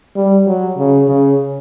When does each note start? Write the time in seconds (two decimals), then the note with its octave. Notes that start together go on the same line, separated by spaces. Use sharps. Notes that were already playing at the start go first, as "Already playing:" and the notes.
0.16 G3
0.47 F#3
0.78 C#3
1.08 C#3